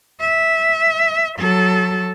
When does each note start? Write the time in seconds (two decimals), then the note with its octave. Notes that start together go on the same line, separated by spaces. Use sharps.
0.20 E5
1.40 F#3 A4